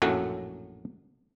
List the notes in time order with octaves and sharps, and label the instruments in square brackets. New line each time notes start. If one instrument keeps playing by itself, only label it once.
[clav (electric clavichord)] A#1 F#2 A2 F#3 A3 F#5